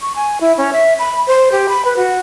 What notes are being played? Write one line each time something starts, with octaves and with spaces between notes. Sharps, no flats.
C#6
G#5
E4
C#4
E5
B5
C5
G4
B5
B4
F#4